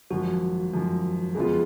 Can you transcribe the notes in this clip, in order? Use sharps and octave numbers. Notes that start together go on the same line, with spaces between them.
G#1 F#2 F3 F#4
G#1 F#2 F3
F2 C#3 G#3 B3 F4 G#4